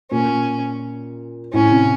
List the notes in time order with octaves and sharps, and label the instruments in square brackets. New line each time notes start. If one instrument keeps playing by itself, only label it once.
[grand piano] A#2 [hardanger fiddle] C#4
[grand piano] A2 [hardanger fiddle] C#4
[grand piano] C3